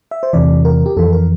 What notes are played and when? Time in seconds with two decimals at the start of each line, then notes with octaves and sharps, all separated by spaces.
0.11 E5
0.23 C5
0.33 E2 C3 E3 D5
0.65 A#4
0.86 G4
0.97 F2 E3 A4
1.13 A#4